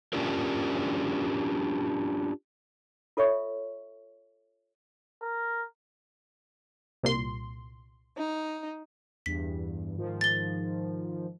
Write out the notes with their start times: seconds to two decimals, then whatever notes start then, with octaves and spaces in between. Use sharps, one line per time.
0.13 C#4 D4 F4 G4 A#4
3.17 F4 A4 C#5 E5 C#6
5.22 A#4
7.03 C2 A#2 C6
8.17 D#4
9.26 E2 G2 B6
9.97 G#2 D#3 F3
10.21 A6 G7